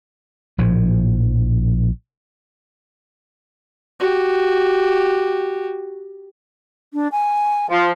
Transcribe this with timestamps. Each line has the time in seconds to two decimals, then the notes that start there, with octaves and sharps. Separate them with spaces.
0.58 A#1 A2 F3
4.00 F#4 G4
6.93 D4
7.12 G#5
7.70 F3 F4